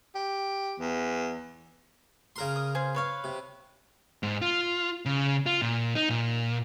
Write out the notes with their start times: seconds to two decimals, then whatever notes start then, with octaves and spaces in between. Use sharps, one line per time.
0.15 G4
0.80 E2
2.36 C#3 A#4 C6
2.56 D#6
2.75 G#4 C5
2.95 B4 C#5 F5
3.24 C3
4.23 G#2
4.42 F4
5.06 C#3
5.46 F4
5.62 A#2
5.95 D#4
6.09 A#2